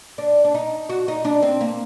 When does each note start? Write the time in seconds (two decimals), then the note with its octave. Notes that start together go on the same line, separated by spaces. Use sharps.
0.18 D4
0.44 D4
0.54 D#4
0.89 F#4
1.08 D#4
1.25 D4
1.42 C4
1.61 A#3